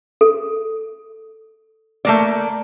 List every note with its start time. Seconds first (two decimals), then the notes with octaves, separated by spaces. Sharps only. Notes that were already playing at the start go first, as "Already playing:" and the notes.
0.21 A4
2.05 A3 A#3 D5